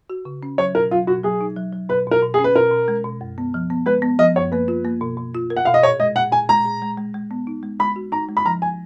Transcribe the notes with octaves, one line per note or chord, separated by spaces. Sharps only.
F#4
C#3
C#4
F#3 C#5
B2 A#4
F#3 F4
B2 F#4
F#3 G#4
D#4
F#3
F#3
B2 B4
B2 A#4
B2
G#4
C#4
B4
B2 A#4
B2
G#3
B2
F#2
B3
F3
B3
G#3 B4
B3
F3 D#5
F#2 C#5
A#3 B4
F4
A#3
B2
B2
F4
A#4
F#5
B2 F5
D#5
A#2 C#5
G#3 D#5
A#2 F#5
A#2 G#5
G#3 A#5
A#2
G#3
G#3
G#3
B3
D#4
G#3
G#3 B5
F#4
D#4 A#5
G#3
B5
F3 A#5
G#5